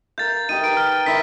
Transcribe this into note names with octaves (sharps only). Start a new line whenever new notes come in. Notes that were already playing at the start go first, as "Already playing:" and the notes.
A#4 F5 G6 A6
D#4 G4 D#5 D#7
A#4 B4 D7 D#7
F6
D#3 E4 B6